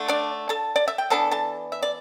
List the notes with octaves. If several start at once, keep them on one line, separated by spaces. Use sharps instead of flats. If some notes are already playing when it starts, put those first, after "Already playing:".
Already playing: D3 A3
D4 D5
A4 A5
D5
E5
G5
E3 B3 D4 A4 A5
A4 A5
E5
D5